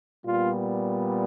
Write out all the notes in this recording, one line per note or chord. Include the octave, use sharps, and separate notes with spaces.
A#2 G3 B3 F4